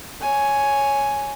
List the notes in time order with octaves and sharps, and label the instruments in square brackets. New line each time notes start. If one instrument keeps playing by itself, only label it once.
[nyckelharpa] C#5 G#5